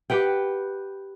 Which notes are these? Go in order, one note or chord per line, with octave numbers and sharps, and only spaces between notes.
G4 B4 F#5 G5